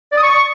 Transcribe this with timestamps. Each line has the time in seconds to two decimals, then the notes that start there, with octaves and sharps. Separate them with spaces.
0.12 D5
0.18 D#6
0.23 C#6